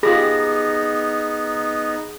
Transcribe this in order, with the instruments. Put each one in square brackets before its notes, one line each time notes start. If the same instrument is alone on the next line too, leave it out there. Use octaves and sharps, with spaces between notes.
[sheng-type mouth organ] B3 D#4 [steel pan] F4 G4 B5 [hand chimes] G#4 A#6